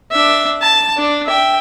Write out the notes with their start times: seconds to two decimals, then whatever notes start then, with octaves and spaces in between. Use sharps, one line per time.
0.11 D4 E5
0.61 A5
0.97 D4
1.26 E5 G5